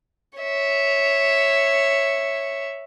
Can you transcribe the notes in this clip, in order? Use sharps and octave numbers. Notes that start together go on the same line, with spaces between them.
C#5 E5